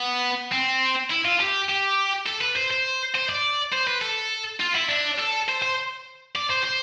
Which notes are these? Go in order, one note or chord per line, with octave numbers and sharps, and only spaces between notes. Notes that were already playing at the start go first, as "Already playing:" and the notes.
Already playing: B3
C4
E4
F4
G4
G4
A4
B4
C5
C5
C5
D5
C5
B4
A4
F4
E4
D4
A4
C5
C5
D5
C5
C5